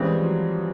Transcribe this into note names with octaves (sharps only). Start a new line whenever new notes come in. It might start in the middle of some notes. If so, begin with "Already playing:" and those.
Already playing: C#3 E3 G3 G#3 C4
F3
F#3